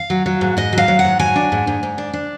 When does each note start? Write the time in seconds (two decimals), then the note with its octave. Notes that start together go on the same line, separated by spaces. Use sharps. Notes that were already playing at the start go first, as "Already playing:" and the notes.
Already playing: F5
0.10 F#3
0.26 F#3
0.41 G#2
0.57 G#2 D#5
0.73 F#3
0.78 F5
0.88 F#3
0.99 F#5
1.05 G#2
1.19 F#3 G#5
1.36 D4
1.52 G#2
1.67 G#2
1.83 G#2
1.98 D4
2.13 D4